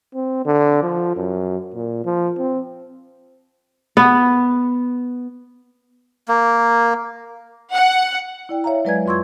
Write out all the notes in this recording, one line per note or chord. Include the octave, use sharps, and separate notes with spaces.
C4
D3
F3
F#2
A#2
F3
C4
B3
A#3
F#5
E4 D5 G5
C#5 E5 F5 A#5
F#3 G#3 B4 D5 G#5 G#6
F2 F4 C6 C#6 E6 G#6